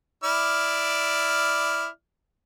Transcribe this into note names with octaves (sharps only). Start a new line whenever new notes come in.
E4 D5 F6